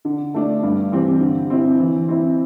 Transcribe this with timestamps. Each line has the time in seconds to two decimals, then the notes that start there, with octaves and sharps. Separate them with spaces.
0.05 D3
0.34 A3 D4
0.63 G2
0.92 E3 C4 G4
1.21 D3
1.50 C4 E4
1.79 E3
2.08 C4 E4